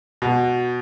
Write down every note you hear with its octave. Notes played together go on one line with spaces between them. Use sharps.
B2